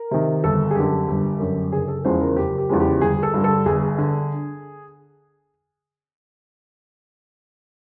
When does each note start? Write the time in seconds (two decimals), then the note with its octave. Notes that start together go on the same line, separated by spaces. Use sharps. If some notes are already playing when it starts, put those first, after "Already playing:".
Already playing: A#4
0.11 C3 D#3
0.44 G1 A4
0.71 G#4
0.75 F#2 D3 G4
1.08 G1
1.40 F#2 D3
1.72 F#1 G#4
1.88 A4
2.05 E2 C#3 F3 G#3 C5
2.21 A#4
2.36 F#1 G4
2.58 G4
2.69 E2 C#3 F3 G#3
2.80 G4
3.01 G1 G#4
3.23 A4
3.34 G2 D3
3.44 A4
3.66 G1 G#4
3.98 D3